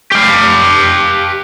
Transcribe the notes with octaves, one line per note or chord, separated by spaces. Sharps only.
G4 F5